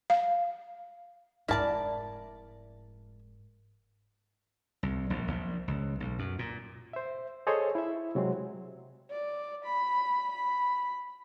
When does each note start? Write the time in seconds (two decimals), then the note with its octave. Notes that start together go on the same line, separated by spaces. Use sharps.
0.10 F5
1.48 F1 G#2 E4 A#4 D5 A5
4.83 C2
5.10 A#1
5.28 A#1
5.68 C#2
6.00 B1
6.19 F#2
6.39 A#2
6.93 C5 E5
7.47 G#4 A4 C5 C#5 D#5
7.75 E4 E5
8.15 C3 F#3 G#3 C4
9.10 D5
9.65 B5
10.32 B5